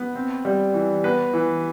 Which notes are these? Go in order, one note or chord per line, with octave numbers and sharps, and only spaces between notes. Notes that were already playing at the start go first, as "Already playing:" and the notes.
Already playing: B3
C4
G3
E3
B3 B4
E3